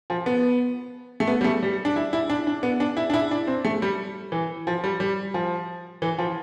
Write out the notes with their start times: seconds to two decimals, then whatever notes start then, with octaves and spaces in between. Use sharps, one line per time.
0.10 F3
0.26 B3
1.20 A3
1.28 B3
1.41 G3
1.44 A3
1.63 G3
1.85 D4
1.96 E4
2.13 E4
2.30 D4
2.47 D4
2.63 B3
2.80 D4
2.97 E4
3.10 D4
3.14 E4
3.31 D4
3.47 C4
3.65 A3
3.82 G3
4.32 E3
4.67 F3
4.84 G3
5.00 G3
5.34 F3
6.02 E3
6.18 F3